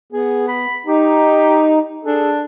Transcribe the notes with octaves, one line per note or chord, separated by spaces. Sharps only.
B3 G#4
B5
D#4 G4
D4 G#4 A4